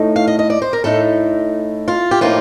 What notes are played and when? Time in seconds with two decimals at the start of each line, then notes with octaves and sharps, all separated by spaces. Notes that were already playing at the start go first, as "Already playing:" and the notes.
Already playing: A2 A3 D#4
0.16 F5
0.27 D#5
0.39 D#5
0.50 D5
0.62 C5
0.73 A#4
0.84 A2 A3 D#4 A4
1.88 F4
2.11 G4
2.21 A2 F3 A#3 D#4 F4